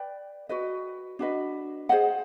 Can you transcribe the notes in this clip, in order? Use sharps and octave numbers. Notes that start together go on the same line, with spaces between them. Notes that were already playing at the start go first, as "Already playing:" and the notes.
Already playing: B4 D5 G5
F#4 B4 D#5
D4 F#4 B4 D#5
G#4 C5 D#5 F#5